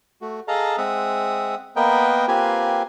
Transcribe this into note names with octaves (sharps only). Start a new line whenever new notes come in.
A3 F#4
G#4 A4 D#5 F5 A5 A#5
G#3 C4 E5 F#5 D#6
A#3 B3 A#4 B4 D#5 G5
A#3 C4 F4 G4 B4 G#5